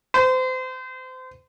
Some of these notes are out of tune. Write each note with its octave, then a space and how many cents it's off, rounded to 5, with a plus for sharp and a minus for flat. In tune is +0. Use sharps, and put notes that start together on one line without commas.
C5 -30